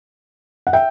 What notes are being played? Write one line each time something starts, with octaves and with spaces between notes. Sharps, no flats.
F#5
E5 G5